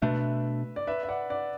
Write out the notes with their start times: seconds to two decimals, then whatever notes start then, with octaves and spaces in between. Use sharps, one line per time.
0.02 B2 A3 D4 B4 E5
0.76 D5
0.87 B4 E5
1.03 E5
1.09 D5 F#5
1.30 D5 F#5